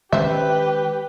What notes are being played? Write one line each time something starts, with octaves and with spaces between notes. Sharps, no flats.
D#3 G#3 C#4 G4 B4 C5 E5